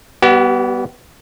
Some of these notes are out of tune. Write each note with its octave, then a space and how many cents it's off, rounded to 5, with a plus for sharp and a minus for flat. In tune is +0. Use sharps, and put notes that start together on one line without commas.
G3 +0 B3 -10 G4 -45